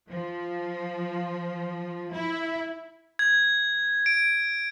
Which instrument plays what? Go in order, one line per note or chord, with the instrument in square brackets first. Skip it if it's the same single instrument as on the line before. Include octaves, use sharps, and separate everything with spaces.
[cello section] F3
E4
[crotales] G#6
D7